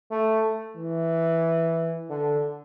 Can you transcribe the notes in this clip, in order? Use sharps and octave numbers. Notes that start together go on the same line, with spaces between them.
A3
E3
D3